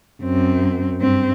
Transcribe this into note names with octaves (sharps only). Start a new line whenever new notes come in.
F#2 C4
G2 C4